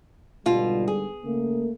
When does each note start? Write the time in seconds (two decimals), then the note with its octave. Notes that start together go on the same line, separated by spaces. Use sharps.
0.46 G#2 B2 D3 G3 F4
0.88 G#4
1.24 C#3 A3 A#3